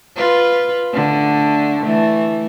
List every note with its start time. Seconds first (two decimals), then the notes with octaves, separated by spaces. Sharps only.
0.16 F4 B4
0.93 D3 A3
1.82 E3 A3